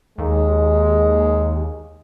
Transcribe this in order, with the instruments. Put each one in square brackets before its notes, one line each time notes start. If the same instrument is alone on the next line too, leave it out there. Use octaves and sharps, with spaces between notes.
[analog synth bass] D#2 [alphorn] G#3